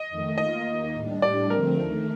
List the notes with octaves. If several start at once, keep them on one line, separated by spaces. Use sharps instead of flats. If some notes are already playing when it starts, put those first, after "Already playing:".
Already playing: D#5
F2 D#3 A3
D#3 A#3 F4 D#5
D#2 D#3 A#3
A2 G3 D4
A2 G3 D4 G4 D5
D3 F3 A3 C4 A#4
D#2 D#3 A3